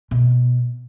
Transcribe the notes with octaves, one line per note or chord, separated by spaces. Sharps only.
B2